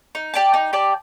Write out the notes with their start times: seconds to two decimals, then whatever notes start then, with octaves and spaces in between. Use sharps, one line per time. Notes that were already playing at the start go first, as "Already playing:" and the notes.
0.15 D#4
0.34 G4 D5 A5
0.54 D#4
0.73 G4 D5 A5